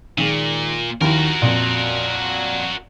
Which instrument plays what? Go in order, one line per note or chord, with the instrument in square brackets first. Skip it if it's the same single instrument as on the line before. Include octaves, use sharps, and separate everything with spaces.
[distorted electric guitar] A#2 [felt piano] D#3 G#3
[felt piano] D#2 D#3 E4 [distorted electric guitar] F#4 A#4
[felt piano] F2 A#2